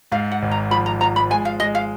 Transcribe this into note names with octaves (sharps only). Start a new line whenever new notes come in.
G#2 F5
F#5
G#1
A#5
F3 B5
A#5
F3 A#5
B5
G#3 G#5
F5
G#3 D#5
F5